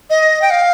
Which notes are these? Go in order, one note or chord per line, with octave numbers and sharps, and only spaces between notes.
D#5
G5
F5